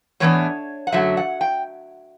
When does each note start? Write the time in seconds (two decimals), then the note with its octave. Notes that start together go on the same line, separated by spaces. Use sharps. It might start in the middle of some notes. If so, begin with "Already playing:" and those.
0.20 A2 E3 B3 D4 C#5
0.87 F#5
0.92 F#2 D3 F#3 A3 E5
1.17 F#5
1.41 G5